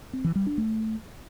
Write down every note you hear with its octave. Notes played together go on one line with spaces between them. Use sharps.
C4
E3
G3
D4
A3